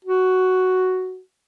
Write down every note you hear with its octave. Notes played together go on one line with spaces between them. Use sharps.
F#4